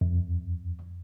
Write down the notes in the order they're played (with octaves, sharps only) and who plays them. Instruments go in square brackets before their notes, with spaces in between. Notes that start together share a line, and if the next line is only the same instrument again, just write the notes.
[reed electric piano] F2